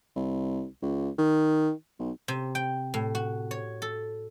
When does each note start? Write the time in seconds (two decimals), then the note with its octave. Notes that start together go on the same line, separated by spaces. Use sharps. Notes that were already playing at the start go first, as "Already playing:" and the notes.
0.16 C2
0.82 C#2
1.18 D#3
1.99 B1
2.28 C3
2.55 G5
2.94 A2
3.15 F#4
3.51 C#5
3.82 A4